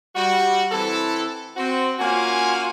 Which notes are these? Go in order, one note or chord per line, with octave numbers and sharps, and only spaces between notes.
G3 F#4
E3 C4 E4 A4
C4 F#4
A#3 C#4 F4 F#4 F5 G#5